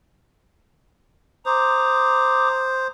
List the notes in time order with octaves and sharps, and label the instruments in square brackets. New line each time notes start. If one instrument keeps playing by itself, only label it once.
[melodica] C5 [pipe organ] A#5 D6 D#6